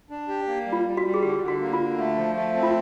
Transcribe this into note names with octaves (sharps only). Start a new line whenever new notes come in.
D4
G4
A#3
G3
F4
G3
F#4
G3
G#4
D3 G4
D3
F#4
A#3
F4
D3
A3
F3
A3
C4
F4